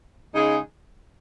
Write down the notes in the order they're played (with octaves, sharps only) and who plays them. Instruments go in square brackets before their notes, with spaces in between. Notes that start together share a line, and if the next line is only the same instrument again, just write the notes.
[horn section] C#3 G#3 D#4 G#4